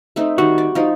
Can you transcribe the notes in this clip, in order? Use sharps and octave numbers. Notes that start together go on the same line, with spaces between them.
A3 C4 D#4
D#3 G3 F#4
D5
F3 D#4